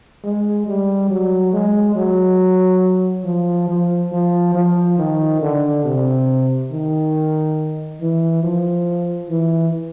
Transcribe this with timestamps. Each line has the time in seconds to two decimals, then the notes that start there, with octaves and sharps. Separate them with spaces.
0.24 G#3
0.67 G3
1.10 F#3
1.53 G#3
1.96 F#3
3.25 F3
3.68 F3
4.12 F3
4.55 F3
4.98 D#3
5.42 D3
5.84 C3
6.71 D#3
8.01 E3
8.43 F3
9.29 E3